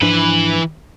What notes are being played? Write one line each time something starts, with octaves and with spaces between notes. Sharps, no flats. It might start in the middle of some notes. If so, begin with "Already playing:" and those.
G#2 E3 F3 D4 B4